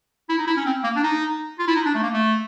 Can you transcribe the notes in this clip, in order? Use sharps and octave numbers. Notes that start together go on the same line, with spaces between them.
E4
D#4
E4
C#4
C4
A#3
D4
D#4
F4
E4
D#4
D4
A3
A#3
A3